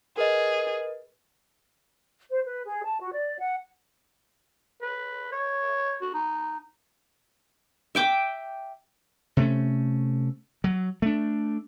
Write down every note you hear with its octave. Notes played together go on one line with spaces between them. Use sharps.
G#4 A#4 B4 D#5
C5
B4
G#4
A5
F#4
D5
F#5
B4
C#5
F#4
D#4
E5 G5 D6
C3 A3 C#4
F#3
A3 D4